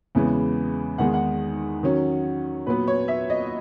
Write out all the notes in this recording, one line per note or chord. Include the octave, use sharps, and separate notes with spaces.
E2 C#3 E3 G#3 B3
E2 D#3 G#3 D#4 F#5
F#5
D#3 F#3 C#4
A#2 F#3 B3 B4
C#5
E5
D#5